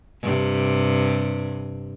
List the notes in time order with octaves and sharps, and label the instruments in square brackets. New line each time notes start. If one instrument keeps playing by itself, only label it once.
[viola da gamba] G2 C3